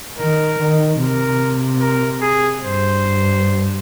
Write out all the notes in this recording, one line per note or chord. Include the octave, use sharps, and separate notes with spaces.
D#3 A#4
D#3
C3 A#4
A#4
G#4
G2 C5